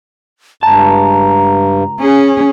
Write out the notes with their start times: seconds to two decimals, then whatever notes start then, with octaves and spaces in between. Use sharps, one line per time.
0.63 C#2 G2 A5 A#5
2.00 C#4 G#4